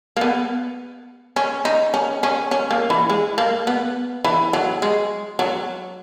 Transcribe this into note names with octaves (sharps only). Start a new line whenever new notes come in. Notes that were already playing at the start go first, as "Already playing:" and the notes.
A#3
B3
C#4
D#4
C#4
C#4
C#4
A#3
E3
G#3
A#3
B3
E3
F#3
G#3
F#3